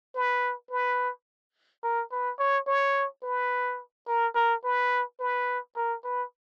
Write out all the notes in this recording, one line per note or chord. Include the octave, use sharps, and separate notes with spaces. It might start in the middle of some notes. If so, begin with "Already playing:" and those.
B4
B4
A#4
B4
C#5
C#5
B4
A#4
A#4
B4
B4
A#4
B4